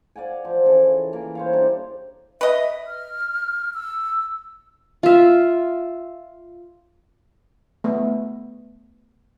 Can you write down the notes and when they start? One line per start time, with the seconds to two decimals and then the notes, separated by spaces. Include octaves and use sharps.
0.16 D5 F5 F#5 G#5
0.45 F3
0.66 C#3 E3 A4
1.13 E3 A#3 A#4
1.35 C5 C#5 F5
1.53 G3 D4 E4 A4
2.41 B4 D#5 E5
2.87 F6
3.74 E6
5.03 F4 E5
7.84 A3 B3